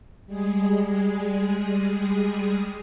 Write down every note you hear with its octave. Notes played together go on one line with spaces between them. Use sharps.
G3 G#3 G#4